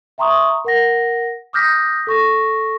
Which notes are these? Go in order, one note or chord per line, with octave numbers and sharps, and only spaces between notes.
E5 G5 A#5 C6 C#6 D#6
A#4 F#5 A#6
D6 D#6 F6 G6 A#6 B6
A4 C#6 A#6